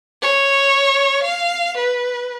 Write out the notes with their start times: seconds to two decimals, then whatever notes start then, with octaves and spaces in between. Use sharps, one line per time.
0.22 C#5
1.23 F5
1.77 B4